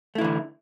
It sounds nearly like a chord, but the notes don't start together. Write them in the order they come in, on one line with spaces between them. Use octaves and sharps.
A3 E4 E3 D3